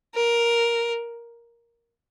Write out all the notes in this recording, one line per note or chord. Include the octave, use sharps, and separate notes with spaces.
A#4